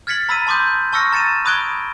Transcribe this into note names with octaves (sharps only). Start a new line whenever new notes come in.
F6 G#6 A6 B6 C#7 F#7
A#5 B5 E6 A6 B6 D#7
A5 C6 D6 D#6 G6
A5 C#6 E6 F6 A#6 C#7
A#5 A6 C#7 D#7 E7
B5 D#6 F#6 G#6 D7 G7